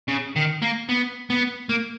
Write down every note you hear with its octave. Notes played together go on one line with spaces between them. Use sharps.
C#3
D#3
A#3
B3
B3
A#3